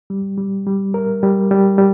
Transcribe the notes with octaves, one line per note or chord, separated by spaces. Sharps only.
G3
G3
G3
A#4
G3
G3
G3